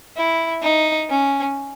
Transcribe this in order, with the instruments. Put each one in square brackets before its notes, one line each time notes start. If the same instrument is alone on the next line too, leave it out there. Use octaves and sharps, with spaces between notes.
[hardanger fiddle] E4
D#4
C#4